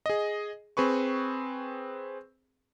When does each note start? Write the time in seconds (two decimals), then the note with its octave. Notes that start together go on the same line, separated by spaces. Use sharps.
0.06 G#4 D#5
0.77 C4 G#4 B4 C#6